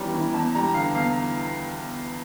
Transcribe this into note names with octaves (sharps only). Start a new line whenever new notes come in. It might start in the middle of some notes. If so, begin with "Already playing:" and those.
Already playing: G1 E3 G3 C#4 A#5
E3
E2 A5
G3 A#5
D3 F5
E2 F5